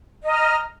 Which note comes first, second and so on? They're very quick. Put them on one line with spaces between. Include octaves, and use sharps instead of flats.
D#5 A#5 F6